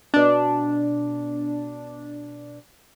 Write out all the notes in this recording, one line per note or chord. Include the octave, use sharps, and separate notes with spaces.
B2 D4